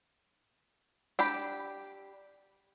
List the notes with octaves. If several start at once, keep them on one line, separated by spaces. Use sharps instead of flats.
D4 G4 B5